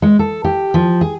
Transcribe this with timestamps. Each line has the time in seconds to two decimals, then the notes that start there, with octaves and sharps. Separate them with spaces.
0.02 G#3
0.19 A4
0.44 G4
0.74 F3
1.01 G#4